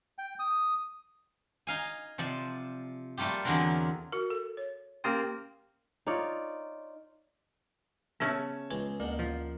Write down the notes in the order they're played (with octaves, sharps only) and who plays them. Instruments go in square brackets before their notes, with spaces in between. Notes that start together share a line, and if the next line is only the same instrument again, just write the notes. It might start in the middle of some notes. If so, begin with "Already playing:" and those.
[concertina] G5
D#6
[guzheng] D#4 F5 G#5
C3 F3 D5 A5
G3 A3 A#3 F4 G4
E2 D3 F#3 C4 D4 A#4
[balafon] F#4 A#4
A4
C#5
[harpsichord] A#3 C4 [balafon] C#4 G4 C5
[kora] D#4 F4 C#5 D5
[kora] C#3 C#4 E5 [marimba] B3 [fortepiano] C#5 A5
[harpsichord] C#2 G#3 D#4 [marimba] B4
[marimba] D2 [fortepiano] A#3 [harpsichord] D4 D#4 F#5
[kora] F3